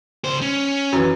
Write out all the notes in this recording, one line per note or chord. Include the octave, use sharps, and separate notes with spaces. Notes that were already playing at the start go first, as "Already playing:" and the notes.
C#2 C5
C#4
F#2 E3